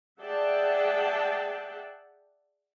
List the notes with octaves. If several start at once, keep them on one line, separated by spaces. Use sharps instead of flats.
G#4 D5 E5 F#5 G5 A5